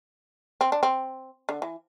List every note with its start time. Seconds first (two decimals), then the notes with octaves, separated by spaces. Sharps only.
0.61 C4
0.72 D4
0.83 C4
1.49 D3
1.62 E3